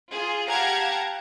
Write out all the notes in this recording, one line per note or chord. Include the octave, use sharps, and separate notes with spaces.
F4 G#4
G4 F5 F#5 A5 A#5 G#6